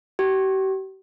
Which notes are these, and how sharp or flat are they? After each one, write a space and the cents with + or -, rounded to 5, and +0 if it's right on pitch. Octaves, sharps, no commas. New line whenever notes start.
G4 -40